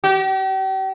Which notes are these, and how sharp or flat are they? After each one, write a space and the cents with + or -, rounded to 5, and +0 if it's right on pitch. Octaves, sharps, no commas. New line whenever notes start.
G4 -40